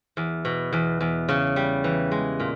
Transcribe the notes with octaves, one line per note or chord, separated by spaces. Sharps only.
E2
B2
E2
E2
C#3
G3
E3
G#3
A#2